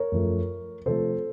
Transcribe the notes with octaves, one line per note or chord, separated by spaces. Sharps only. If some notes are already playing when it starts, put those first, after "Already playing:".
Already playing: A#4 C#5
F#2 F3 A3
C3 F3 A3 A4 C5